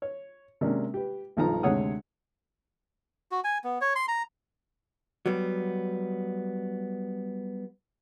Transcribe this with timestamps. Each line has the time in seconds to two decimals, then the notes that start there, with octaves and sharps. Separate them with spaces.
0.02 C#5
0.61 C3 G#3 A#3 C#4 D4
0.94 G4 B4
1.37 B1 G2 F3 D#4 A#5
1.63 D2 C3 G#3 C#5 F#5 D#6
3.31 F#4
3.44 G#5
3.64 B3
3.81 C#5
3.96 C6
4.08 A#5
5.26 F#3 G3 B3